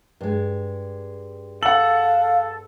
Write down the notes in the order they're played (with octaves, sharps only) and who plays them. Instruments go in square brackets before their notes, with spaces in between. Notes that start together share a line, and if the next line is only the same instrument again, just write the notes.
[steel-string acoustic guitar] G2 G#3
[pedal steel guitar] A4 [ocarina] F5 [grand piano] F#5 F#7